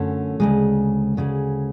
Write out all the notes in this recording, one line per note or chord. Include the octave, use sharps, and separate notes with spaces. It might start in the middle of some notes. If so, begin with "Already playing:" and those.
Already playing: F#2 D3 A3 C#4
D2 C#3 G#3
D2 C#3 G#3